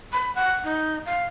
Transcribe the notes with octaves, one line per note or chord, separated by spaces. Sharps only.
B5
F#5
D#4
F5